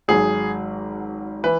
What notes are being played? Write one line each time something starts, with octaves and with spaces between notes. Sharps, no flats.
G#1 G#2 F#3 G#4
E3 B4